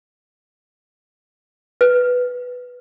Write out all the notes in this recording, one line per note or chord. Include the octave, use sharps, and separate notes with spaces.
B4